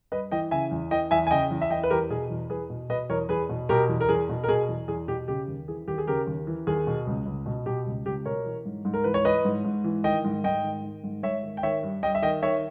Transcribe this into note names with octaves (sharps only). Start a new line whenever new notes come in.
G2 B4 D#5
E3 D#5 G5
C#3 E5 G#5
E2
E3 D#5 G5
E2 E5 G#5
G#5
C#3 D#5 G5
E2
E5
E3 D#5 G5
B4
E2 G4 A#4
B2 G#4
E2
E2 G#4 B4
B2
B2 B4 D#5
E2 A#4 C#5
E2 G#4 B4
B2
B2 G4 A#4
E2
A#4
E2 G#4
B2
A#4
B2 G#4
E2
E2 G#4
B2 G4
C#3 G4
D#2
E3 G#4
D#2 G4
G#4
C#3 G4 A#4
D#2
E3
D#2 G#4
B2
C#2
C#2
B2
B2 G4
C#2
C#2 G4
B2 A#4 C#5
E3
G#2
G#2
A#4
E3 B4
C#5
E3 B4 D#5
G#2
G#2
E3
D#3 D#5 G5
G#2
G#2 D#5 G5
D#3
D#3
G#2
G#2 C#5 E5
D#3
G5
D#3 C#5 E5
G2
G2 D#5 G5
E5
D#3 D#5 G5
D#3 C#5 E5